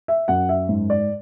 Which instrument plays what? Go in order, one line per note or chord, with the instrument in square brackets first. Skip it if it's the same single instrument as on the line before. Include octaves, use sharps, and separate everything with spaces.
[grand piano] E5
F#2 F#5
E5
G#2
D5